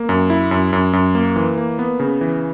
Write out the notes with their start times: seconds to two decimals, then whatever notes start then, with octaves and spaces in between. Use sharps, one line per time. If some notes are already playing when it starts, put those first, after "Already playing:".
Already playing: A#3
0.09 F#2
0.30 E4
0.51 F#2
0.73 F#2
0.93 F#2
1.15 A#3
1.36 E3
1.58 A#3
1.79 B3
2.00 C#3
2.21 E3